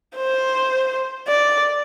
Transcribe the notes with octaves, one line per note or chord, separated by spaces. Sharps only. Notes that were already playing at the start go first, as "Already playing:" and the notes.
C5
D5